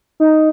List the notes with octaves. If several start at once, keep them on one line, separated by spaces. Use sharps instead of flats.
D#4